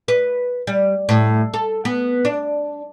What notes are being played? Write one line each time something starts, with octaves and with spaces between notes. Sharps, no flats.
B4
G3
A2
A4
B3
D4